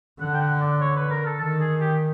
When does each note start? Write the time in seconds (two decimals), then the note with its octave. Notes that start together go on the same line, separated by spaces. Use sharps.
0.21 D3 F#5
0.34 G5
0.41 F#5
0.61 D5
0.81 C#5
0.96 B4
1.11 A#4
1.26 A4
1.40 D#3 A4
1.60 G#4
1.80 G4